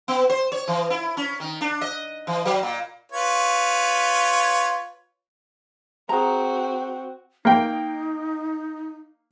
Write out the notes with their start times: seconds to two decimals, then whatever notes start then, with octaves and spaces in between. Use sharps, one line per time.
0.08 B3
0.30 C5
0.52 C#5
0.68 E3
0.90 E4
1.17 C#4
1.40 D#3
1.61 D4
1.81 D#5
2.27 E3
2.45 F#3
2.63 A#2
3.12 F4 B4 C#5
6.09 C4 F#4 G#4 A#5
7.45 A#3 D#4 G5